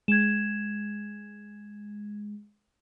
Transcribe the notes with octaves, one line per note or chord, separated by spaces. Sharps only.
G#3 G#6 E7